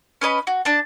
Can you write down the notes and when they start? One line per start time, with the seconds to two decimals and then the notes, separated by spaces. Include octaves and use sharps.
0.21 C#4 B4 D#5 B5
0.47 F#4
0.65 D4 A5